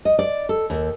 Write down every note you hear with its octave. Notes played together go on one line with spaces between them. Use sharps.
D#5
D5
A4
D#2